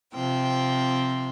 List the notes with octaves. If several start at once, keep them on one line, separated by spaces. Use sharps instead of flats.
C3 F3 C4 G5